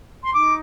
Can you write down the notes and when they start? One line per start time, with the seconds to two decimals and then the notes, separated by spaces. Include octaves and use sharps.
0.24 C6
0.32 D#4 D6